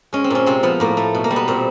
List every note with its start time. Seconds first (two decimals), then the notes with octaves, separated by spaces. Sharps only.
0.13 G#3 C#4
0.24 C4
0.30 A#2 C#4
0.46 C3 C4
0.63 F3 B3
0.80 A2 A#3
0.97 A3
1.15 B2
1.24 A#3
1.31 G3
1.36 B3
1.48 A#2 C4